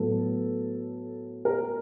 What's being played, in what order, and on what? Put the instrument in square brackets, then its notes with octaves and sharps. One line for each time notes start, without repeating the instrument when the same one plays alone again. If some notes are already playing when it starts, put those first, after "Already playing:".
Already playing: [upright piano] A2 F#3 B3 A4
A#4